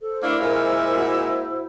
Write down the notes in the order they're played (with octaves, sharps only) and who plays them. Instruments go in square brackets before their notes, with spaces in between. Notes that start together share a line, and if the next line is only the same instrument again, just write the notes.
[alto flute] A4 [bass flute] C5
[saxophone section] A3 A#3 D4 [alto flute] E4
[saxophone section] A#2 G#3 E5 [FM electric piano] A#4 F6
[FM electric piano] F#4